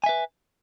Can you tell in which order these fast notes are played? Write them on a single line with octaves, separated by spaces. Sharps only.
G#5 E5 B4